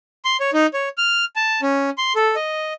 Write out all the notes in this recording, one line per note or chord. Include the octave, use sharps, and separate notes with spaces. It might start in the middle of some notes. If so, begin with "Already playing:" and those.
C6
C#5
D#4
C#5
F6
A5
C#4
C6
A4
D#5